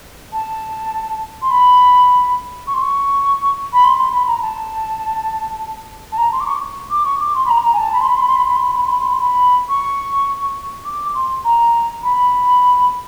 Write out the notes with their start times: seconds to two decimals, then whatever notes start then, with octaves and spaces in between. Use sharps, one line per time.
0.33 A5
1.42 C6
1.50 B5
2.67 C#6
2.74 C6
2.82 C#6
3.73 B5
3.84 C6
3.99 C6
4.13 B5
4.27 A#5
4.38 A#5
4.42 A5
6.12 A5
6.18 A#5
6.32 C6
6.40 D6
6.47 C#6
6.91 D6
7.05 C#6
7.20 D6
7.35 C6
7.46 B5
7.50 A#5
7.64 A#5
7.73 G#5
7.78 A5
7.93 B5
8.00 C6
8.08 B5
8.14 C6
8.21 B5
8.28 C6
8.36 B5
8.42 C6
8.49 B5
8.56 C6
8.63 B5
8.71 C6
8.77 B5
8.84 C6
8.92 B5
8.99 C6
9.06 B5
9.13 C6
9.19 B5
9.69 C#6
10.85 D6
11.15 C6
11.44 A#5
12.03 B5